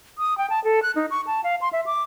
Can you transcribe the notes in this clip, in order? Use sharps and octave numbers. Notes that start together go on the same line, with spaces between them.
D#6
G5
A5
A4
F#6
D#4
C#6
A5
F5
C6
E5
D6